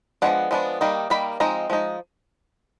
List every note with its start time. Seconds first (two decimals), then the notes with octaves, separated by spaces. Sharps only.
0.22 F3 G#3 B3 D4 F#5
0.51 F3 G#3 B3 D4
0.81 D#3 G3 A#3 D#4
1.10 D#3 G3 A#3 D#4 B5
1.40 F3 G#3 C4 D#4 A#5
1.70 F3 G#3 D#4